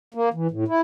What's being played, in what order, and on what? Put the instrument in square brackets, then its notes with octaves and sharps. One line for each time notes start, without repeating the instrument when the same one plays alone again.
[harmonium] A#3
E3
A2
E4